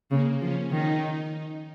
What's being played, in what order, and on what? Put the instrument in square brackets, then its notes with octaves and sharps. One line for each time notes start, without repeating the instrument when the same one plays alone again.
[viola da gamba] C#3 [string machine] A#3
[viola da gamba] F3 [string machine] C#4
[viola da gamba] D#3 [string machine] D#4